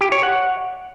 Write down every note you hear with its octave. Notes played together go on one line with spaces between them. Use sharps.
G4
C#5
F#5